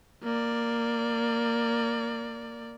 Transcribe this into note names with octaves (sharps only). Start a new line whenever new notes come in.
A#3 D5